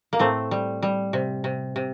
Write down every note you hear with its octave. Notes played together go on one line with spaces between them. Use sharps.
A#3
A2 A3 C4
G3
G3
C3
C3
C3